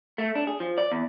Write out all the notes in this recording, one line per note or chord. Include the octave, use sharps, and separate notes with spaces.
A3
D4
G#4
F3
D5
E2